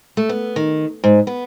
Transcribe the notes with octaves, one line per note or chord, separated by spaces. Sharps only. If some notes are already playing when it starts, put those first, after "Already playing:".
A3
B3
D#3
G#2
B3